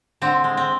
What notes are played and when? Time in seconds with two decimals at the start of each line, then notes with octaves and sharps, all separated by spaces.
0.22 D3 C4
0.44 G#3
0.57 C4